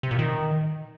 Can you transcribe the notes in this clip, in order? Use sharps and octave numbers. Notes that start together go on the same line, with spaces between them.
C3
A#2
D#3